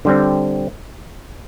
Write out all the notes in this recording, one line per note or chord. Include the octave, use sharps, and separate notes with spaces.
D3 G3 C4